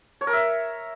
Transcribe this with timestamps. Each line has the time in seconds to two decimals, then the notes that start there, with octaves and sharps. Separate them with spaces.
0.21 C#5
0.27 A#4
0.33 E5